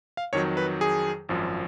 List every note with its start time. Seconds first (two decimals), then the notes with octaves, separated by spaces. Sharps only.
0.17 F5
0.33 F2 D#3 F#3 C#5
0.57 B4
0.81 G#4
1.29 G#1 F#2 F3